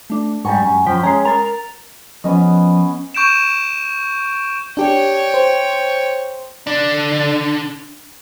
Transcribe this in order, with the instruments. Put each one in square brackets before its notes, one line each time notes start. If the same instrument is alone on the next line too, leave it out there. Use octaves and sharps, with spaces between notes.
[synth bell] A3 D4
[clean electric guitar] G#2 G3 [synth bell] C#6
[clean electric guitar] F#2
[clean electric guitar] F#2 F3 [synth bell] G5 B6
[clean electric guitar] G#3 C#4 [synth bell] A#5 C7
[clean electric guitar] A#4 [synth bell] A6 F7
[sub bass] F3 [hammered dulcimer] B3 C#4 D#5
[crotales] C#6 G6 D7 E7
[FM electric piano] D4 G4 [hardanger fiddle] C#5 G5
[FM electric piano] C5
[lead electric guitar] D3 D4